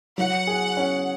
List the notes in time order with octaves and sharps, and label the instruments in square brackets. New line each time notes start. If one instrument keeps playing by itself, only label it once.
[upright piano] F#3 [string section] F#5
[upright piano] G#4
C#4